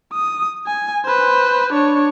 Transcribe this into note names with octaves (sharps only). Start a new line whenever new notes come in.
D#6
G#5
B4 C5
D4 C#5